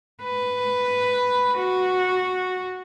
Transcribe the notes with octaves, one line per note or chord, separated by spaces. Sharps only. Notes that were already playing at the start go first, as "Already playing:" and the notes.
B4
F#4